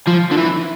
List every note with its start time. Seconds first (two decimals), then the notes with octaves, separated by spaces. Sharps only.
0.07 F3
0.31 D3
0.37 E3